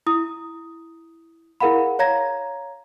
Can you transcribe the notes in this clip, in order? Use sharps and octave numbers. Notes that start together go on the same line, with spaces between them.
E4 D#6
E4 G#4 A#4 F5 F#5 B5
C#5 F5 A#5 G#6 A#6